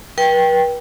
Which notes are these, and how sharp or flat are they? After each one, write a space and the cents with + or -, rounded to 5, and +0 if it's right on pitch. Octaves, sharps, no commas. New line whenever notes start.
B4 -40 G5 +0